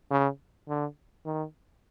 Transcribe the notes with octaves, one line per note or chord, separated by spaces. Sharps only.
C#3
D3
D#3